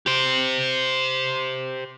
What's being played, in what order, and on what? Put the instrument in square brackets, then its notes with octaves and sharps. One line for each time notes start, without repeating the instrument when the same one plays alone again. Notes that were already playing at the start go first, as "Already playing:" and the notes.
[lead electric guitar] G4 C5